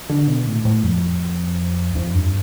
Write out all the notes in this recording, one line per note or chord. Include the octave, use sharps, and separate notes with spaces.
D3
B2
A2
A2
F2
F2
G2